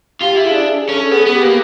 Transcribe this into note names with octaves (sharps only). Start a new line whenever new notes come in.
F4 G4
E4
G#4
D4
G#4
C#4 A4
B3 G#4
B3
G4
A#3